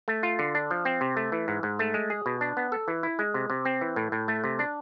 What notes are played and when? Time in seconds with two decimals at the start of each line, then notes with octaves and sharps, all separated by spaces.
0.08 A3
0.23 F4
0.39 D3
0.55 D4
0.71 F3
0.85 C4
1.01 C3
1.17 A3
1.32 E3
1.48 G#2
1.63 G#2
1.79 A3
1.94 G#3
2.10 G#4
2.26 B2
2.41 D4
2.57 B3
2.72 A4
2.88 E3
3.03 E4
3.19 G#3
3.34 C3
3.50 C3
3.65 C4
3.81 E3
3.96 A2
4.12 A2
4.28 A3
4.44 C3
4.59 D4